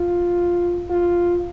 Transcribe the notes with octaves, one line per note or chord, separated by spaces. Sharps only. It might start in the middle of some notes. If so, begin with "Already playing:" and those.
Already playing: F4
F4